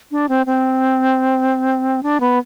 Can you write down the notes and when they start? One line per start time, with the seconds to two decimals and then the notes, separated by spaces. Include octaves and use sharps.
0.11 D4
0.29 C4
0.46 C4
2.03 D4
2.20 B3